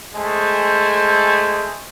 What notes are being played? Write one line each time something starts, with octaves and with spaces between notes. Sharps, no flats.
G#3 A3 C5 G#5